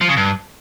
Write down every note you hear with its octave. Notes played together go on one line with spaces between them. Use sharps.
F3
C#3
G2